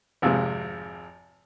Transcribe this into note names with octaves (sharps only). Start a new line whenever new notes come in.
G#1 F2 C3 G#3